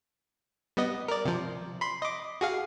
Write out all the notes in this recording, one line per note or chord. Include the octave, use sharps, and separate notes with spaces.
G3 B3 D#5
A#4 D5
C3 F3
B5 C6
D#5 D6
F#4 G#4 F5